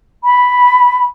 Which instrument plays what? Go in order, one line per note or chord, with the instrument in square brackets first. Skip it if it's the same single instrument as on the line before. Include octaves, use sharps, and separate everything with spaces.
[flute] B5